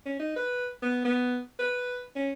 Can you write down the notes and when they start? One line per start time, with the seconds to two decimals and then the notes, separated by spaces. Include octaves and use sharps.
0.05 C#4
0.19 D#4
0.36 B4
0.82 B3
1.05 B3
1.59 B4
2.16 C#4